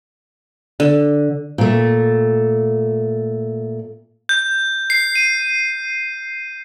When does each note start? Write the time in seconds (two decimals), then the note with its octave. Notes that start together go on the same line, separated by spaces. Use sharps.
0.80 D3
1.58 A#2 A3
4.29 G6
4.90 C7
5.15 D#7